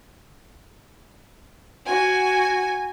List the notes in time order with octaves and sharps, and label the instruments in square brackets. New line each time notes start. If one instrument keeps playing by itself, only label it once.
[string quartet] F#4 [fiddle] G#5